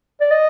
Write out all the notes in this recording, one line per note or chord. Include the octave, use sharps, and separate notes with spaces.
D5
D#5